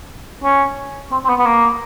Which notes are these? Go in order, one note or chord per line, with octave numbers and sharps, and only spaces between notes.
C#4
C4
C4
B3
B3
A#3